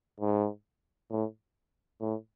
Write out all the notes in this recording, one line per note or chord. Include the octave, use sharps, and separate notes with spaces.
G#2
A2
A2